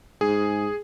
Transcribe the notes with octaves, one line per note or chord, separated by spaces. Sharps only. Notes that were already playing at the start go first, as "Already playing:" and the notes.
G#2 G#4